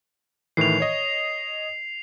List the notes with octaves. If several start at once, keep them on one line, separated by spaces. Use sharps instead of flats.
A2 D#3 E3 C7 F7
C#5 D#5